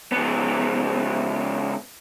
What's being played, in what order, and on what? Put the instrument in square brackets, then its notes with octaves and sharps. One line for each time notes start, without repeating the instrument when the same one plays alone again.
[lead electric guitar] C#2 B3